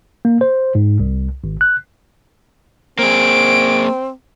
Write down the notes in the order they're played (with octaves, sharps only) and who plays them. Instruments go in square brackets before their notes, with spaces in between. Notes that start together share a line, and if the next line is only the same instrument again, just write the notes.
[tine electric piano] A#3
C5
G#2
C2
G#1
F#6
[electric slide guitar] A#3 G#4 [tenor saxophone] C4 [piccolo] D7